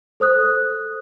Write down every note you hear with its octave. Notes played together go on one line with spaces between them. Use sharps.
A4 C5 D#6 F#6